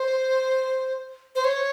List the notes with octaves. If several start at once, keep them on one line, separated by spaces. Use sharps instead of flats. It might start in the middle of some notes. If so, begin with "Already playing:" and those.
Already playing: C5
C5
C#5